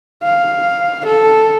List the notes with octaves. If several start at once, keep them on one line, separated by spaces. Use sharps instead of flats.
F5
A4